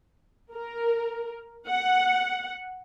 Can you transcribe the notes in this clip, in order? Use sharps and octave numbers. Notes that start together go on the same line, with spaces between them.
A#4
F#5